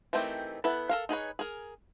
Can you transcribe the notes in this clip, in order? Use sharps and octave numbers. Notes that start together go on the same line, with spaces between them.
D#3 E3 A3 C4 G4
B3 E4 A4 B4
A4 A#4 F5
D#4 G#4 B4 C#5
G#4 A#4